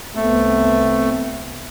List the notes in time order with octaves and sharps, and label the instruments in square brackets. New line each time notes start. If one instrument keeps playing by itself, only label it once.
[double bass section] C2 B3 C4 [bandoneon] A3